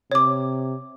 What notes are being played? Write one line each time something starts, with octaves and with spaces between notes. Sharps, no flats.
C3 C#5 D6